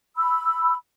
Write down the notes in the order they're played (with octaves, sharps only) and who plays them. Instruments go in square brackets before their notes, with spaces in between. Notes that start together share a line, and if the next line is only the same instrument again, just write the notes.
[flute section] B5 E6